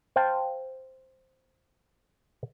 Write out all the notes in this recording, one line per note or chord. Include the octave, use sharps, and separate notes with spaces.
C5 F5 G5 A5